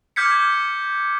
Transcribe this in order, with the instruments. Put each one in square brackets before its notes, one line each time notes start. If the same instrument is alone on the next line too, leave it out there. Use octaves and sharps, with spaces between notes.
[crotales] D6 F6 G6 G#6 B6 C#7